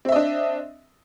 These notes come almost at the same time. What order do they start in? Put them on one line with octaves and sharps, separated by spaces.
C4 E5 D#5 D4